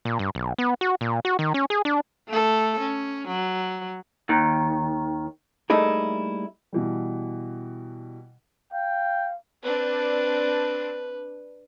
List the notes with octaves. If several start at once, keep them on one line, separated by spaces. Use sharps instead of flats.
A#2
G2
B1
B3
F#4
A#2
F#4
D#3
C#4
G#4
D4
A3 A4
C#4
F#3
D#2 D#3
G3 A3 A#3 D#4 E4 G#4
B2 E3 G3
F5 G5
C4 D4 B4